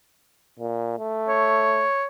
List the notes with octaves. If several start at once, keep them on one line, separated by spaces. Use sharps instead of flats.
A#2
A3
C#5